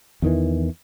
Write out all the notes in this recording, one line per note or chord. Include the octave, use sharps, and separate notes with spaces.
E2 D#3 E3